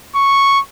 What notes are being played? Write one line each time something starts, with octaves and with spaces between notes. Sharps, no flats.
C#6